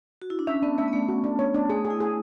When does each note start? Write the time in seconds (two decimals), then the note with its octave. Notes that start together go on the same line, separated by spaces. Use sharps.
0.22 F#4
0.30 E4
0.39 D4
0.47 C#4 E5
0.62 B3 D4
0.78 A3 E5
0.88 B3
0.93 A3 D4
1.08 A3 F#4
1.24 D4
1.39 A3 C#5
1.54 D4
1.70 A3 G#4
1.85 G#4
1.90 E4
2.00 G#4